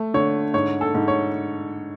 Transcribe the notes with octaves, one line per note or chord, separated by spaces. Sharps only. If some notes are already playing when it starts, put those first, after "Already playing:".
Already playing: A3
D3 C#5
G#2 C#5
A4
G#2
C#5